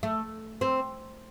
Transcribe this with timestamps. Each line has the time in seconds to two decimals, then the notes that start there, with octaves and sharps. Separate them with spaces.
0.03 A3
0.61 C4